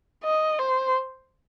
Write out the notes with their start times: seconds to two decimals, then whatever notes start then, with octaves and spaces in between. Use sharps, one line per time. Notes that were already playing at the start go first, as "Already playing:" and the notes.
0.24 D#5
0.59 C5